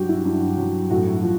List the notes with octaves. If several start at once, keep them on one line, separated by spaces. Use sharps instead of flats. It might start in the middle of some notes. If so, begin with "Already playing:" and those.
Already playing: G2 F#3 F#4 G4
E4
G2
F#3
A2 F#4
F3